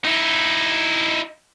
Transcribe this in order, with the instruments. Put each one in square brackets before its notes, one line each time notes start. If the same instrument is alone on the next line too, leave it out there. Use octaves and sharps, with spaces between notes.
[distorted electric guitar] D#4 E4